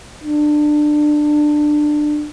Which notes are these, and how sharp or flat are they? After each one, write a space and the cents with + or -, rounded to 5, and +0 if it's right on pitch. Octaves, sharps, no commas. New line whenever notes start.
D4 +20